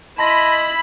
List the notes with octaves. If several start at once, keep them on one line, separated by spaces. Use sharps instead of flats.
E4 D#5 A5 B5 C6 A#6